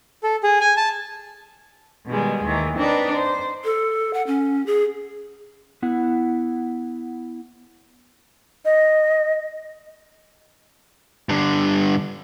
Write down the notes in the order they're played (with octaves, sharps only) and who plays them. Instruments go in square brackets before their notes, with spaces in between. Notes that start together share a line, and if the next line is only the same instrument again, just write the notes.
[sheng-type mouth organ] A4
G#4
G#5
A5
[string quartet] B2 D#3 G3 G#3
D#2 D#3 E3
C4 D4 D#4 B4
C5
[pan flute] A4
F#5
C#4
G#4
[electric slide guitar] B3 E4 F#5
[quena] D#5
[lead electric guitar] G2 D3